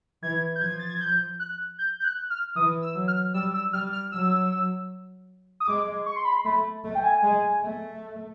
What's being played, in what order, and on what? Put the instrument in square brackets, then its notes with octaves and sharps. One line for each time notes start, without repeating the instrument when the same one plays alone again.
[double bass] E3 [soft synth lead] G#6
[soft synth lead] G6
[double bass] F3 [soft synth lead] G#6
[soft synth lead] A6
G#6
G6
F#6
G6
G6
F#6
F6
[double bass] E3 [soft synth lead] D#6
[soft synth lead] E6
[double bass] F#3
[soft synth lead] F6
[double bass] G3 [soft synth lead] E6
[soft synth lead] E6
[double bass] G3 [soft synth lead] F6
[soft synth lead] F6
[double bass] F#3 [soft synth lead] E6
[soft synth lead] D#6
[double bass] G#3 [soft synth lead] D6
[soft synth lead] C#6
C6
B5
C6
[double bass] A3 [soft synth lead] B5
[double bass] A3
[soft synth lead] G5
G#5
[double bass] G#3
A3